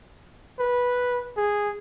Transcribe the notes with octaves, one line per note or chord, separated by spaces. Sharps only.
B4
G#4